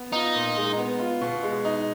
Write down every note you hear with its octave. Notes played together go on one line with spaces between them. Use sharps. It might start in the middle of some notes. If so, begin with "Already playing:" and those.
Already playing: B3
D#4 F4
A#2
G#3
B3
F4
B2
G#3
D#4